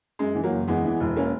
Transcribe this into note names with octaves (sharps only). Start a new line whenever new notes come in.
F#2 G#3
E3
F#3 A#3
F#1
E2 G#3 B3
E3
E1
A#3 C#4